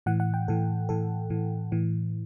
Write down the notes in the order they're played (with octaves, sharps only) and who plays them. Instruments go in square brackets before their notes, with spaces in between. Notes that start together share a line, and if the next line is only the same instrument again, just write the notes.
[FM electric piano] A2 E3 F#5
F#5
G5
A2 E3 A4
A2 E3 A4
A2 E3
A2 E3